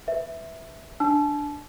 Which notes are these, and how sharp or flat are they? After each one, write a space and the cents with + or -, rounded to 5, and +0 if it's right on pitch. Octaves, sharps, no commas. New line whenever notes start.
B4 +15 E5 -5
D4 +0 A5 -30 E6 +40